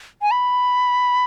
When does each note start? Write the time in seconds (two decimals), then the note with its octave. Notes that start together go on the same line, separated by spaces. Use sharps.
0.22 G#5
0.31 B5